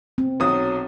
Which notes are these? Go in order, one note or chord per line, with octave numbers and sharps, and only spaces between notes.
C4
B1 F#3 D#6